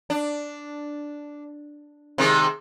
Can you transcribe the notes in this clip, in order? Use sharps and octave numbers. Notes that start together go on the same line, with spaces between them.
D4
C3 D#3 G#3